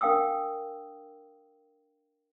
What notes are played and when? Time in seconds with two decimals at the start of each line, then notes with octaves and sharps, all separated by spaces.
0.01 D4 A#4 F5 G5 D#6 E6